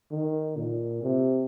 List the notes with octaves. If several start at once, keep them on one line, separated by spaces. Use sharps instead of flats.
D#3
A#2
C3